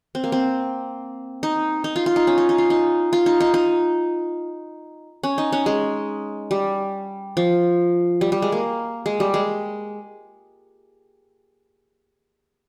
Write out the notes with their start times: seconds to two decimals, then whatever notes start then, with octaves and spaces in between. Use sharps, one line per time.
0.15 C4
0.24 A#3
0.32 C4
1.43 D#4
1.84 D#4
1.96 F4
2.06 F4
2.16 D#4
2.27 C#4
2.38 D#4
2.49 D#4
2.58 F4
2.70 D#4
3.13 F4
3.26 D#4
3.40 D#4
3.54 D#4
5.23 C#4
5.38 D#4
5.53 C#4
5.66 G#3
6.51 G3
7.37 F3
8.21 G3
8.32 G3
8.42 G#3
8.52 A#3
9.06 G#3
9.20 G3
9.34 G#3